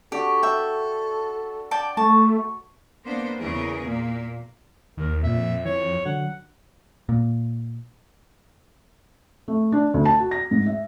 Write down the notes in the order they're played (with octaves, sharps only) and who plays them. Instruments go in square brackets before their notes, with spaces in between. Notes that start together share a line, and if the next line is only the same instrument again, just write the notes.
[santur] D4 F#4 [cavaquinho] G4 [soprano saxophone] A4
[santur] B4 [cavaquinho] E5 G5
[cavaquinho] D5 G5 A5
[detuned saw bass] A3 [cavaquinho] A5 [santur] C#6
[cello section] A#3 B3 D4 C5
E2 C#3 E3 G#4 A#4
A#2 A#3
[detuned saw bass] D#2 [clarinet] A#4
[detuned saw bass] F2 [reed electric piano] A#2 [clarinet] E5
[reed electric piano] E3 [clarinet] C#5
[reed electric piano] D3 F#3 [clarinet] F#5
[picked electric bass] A#2
[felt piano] A3
D4
D2
A5
F#4
A#6
G#2
E5